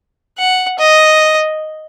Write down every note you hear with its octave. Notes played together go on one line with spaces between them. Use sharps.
F#5
D#5